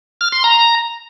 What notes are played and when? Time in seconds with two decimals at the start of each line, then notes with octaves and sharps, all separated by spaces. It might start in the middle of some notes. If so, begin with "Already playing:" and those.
0.21 F6
0.32 C6
0.44 A#5